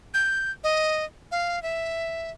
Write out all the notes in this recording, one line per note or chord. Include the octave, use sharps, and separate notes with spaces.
G6
D#5
F5
E5